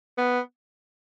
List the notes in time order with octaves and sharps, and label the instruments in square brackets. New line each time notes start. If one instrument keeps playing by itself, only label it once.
[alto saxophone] B3